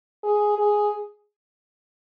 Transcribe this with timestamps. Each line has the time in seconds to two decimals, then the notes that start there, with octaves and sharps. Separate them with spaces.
0.24 G#4
0.58 G#4